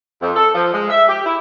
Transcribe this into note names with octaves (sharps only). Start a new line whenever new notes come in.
F2
A4
F3
G#3
E5
G4
E4